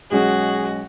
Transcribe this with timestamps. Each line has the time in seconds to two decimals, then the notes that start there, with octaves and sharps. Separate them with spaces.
0.11 B1 G#3 C#4 F#4 G#4